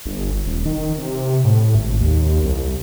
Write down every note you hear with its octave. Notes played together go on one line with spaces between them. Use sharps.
G1
D#1
D#3
C3
A2
G#1
D#2
C2